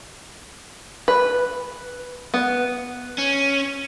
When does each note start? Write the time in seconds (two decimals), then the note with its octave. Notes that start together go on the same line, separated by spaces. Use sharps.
1.08 B4
2.34 B3
3.18 C#4